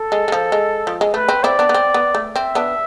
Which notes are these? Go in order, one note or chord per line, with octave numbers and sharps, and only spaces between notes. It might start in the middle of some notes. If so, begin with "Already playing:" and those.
Already playing: A4
G#3
G#3
F3
G#3
F3
G#3
A3 B4
C4
C4 E4 D5
B3 D4
B3
C4
B3
A3
C4 E5
B3 D4